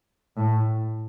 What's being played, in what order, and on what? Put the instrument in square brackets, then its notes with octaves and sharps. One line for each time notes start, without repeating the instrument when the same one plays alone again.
[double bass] A2